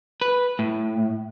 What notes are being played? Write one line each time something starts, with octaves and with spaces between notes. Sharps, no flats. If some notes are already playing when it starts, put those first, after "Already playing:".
B4
A2